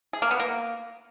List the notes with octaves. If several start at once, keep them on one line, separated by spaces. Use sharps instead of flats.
G#4
A#3
B3
A#3